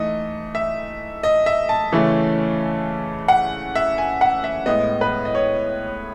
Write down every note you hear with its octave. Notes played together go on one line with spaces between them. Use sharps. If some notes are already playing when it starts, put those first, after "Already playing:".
Already playing: E3 A3 D#4 D#5
E5
D#5
E5
A5
C#3 E3 A3 C#4
F#5
E5
G#5
F#5
E5
A2 G#3 B3 D#5
B4
D#5
C#5